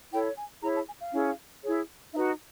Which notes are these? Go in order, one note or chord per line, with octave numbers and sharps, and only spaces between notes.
E4 A4 C#5 G5
G#5
E4 G#4 C#5 A#5
A5
G#5
F5
C#4 E4 G#4
E4 G#4 C#5
D#4 F#4 B4 E5